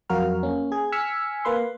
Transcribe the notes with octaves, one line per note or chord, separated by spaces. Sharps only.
F2 F#3 F#4 A#4 F5 F6
A#3 C#4
G#4 G#6
G#5 E6 F6 G#6 B6 C#7
A#3 B4 C6